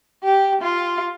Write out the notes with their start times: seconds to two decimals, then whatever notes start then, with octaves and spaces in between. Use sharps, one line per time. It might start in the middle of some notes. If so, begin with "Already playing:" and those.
0.24 G4
0.62 F4